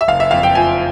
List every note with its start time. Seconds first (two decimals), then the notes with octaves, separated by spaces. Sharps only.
0.01 E5
0.08 F#1 F5
0.20 E5
0.31 F2 F5
0.43 G5
0.55 F3 G#5